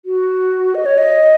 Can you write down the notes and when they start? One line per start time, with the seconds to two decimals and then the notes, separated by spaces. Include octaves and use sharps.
0.05 F#4
0.75 D#5
0.86 C#5
0.98 D#5